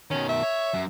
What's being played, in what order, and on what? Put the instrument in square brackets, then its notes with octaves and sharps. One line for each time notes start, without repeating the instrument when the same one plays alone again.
[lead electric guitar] B2 D#3 [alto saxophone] C#4
[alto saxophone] E5
[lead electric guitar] C#5
F#2